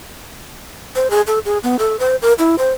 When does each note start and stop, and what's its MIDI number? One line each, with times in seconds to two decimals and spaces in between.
0.96 1.10 72
1.10 1.21 68
1.27 1.39 69
1.45 1.58 68
1.63 1.77 59
1.79 1.99 69
1.99 2.16 72
2.22 2.33 70
2.39 2.56 64
2.59 2.71 72